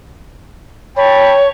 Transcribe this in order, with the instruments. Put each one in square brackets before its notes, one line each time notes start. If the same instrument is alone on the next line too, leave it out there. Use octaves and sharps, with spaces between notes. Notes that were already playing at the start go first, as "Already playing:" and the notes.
[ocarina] C#5 [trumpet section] G5 A5 B5